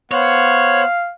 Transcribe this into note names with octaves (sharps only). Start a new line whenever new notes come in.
B3 C5 C#5 F5 F#6